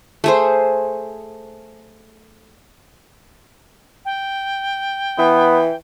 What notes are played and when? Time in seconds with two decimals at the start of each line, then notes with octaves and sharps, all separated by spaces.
0.24 A3 G#4 C5
4.05 G5
5.18 E3 B3